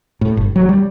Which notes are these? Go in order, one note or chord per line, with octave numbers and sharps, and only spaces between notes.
A2
G1
F#3
G3